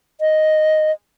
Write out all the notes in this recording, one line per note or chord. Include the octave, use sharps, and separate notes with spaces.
D#5